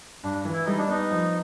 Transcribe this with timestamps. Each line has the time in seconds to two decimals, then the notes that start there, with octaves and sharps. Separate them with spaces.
0.23 G2 D4
0.45 E3
0.53 E4
0.65 G3 D#4
0.78 D4
0.88 B3 D#4
1.11 F3